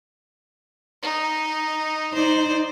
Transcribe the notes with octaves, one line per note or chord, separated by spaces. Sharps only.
D#4
D#4 C5 D5